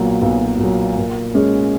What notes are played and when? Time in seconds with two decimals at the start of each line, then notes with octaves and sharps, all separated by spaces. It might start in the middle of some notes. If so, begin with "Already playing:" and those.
Already playing: B1 A#2 F#3
0.22 B1
0.59 A#2 F#3
0.97 A#2
1.35 G#3 C#4